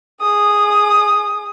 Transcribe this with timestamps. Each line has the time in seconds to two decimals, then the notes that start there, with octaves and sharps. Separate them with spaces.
0.22 G#4 D#6